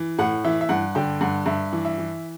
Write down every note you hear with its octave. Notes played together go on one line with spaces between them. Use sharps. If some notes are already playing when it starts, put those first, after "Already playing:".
Already playing: E3
A2 F#5
E3 E5
E5
G2 F#5
D3 G5
G2 F#5
G2 E5
E3
E5
E3